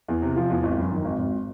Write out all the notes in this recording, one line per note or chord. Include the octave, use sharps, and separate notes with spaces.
E2
C3
F3
E2
G#1
F#2
D#3
G#1
G#1